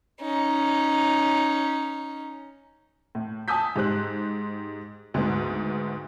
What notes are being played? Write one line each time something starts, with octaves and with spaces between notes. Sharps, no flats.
C#4 D#4
A2
G#5 A5 D#6 E6 G6 B6
G#2 G4 C5 F#6
D2 G#2 B3